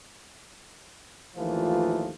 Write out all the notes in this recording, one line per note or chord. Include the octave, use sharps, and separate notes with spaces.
A1 D#2 E3 F3 A3 F4